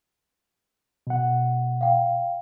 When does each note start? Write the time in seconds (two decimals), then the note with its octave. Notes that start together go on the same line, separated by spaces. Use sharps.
1.07 B2 F#5
1.81 F5 G5